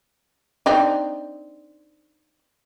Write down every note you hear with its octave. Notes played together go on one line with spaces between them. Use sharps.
C4 D4 D#4